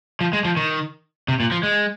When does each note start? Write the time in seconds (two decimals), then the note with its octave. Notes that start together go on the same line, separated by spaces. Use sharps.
0.21 F3
0.33 G#3
0.45 F3
0.57 D#3
1.28 C3
1.40 A#2
1.52 F3
1.63 G#3